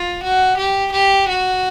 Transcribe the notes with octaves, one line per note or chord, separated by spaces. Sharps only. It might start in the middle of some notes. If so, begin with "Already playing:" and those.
Already playing: F4
F#4
G4
G4
F#4